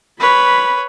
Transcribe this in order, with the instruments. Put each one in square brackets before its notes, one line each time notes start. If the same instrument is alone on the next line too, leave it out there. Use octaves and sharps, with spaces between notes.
[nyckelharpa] B4 C#5 [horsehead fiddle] B5